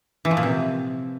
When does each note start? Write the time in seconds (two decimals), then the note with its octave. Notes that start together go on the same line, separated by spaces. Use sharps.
0.25 E3
0.31 F3
0.37 A#2
0.43 C3